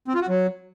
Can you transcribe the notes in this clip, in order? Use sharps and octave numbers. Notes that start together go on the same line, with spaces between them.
C4
F4
F#4
F#3